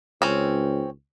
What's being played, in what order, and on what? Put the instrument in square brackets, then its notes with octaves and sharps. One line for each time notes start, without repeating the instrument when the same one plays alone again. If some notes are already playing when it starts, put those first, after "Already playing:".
[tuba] C#2 [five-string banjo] C4 C#4